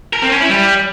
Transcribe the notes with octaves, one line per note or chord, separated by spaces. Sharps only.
A#4
C4
C#4
E4
G3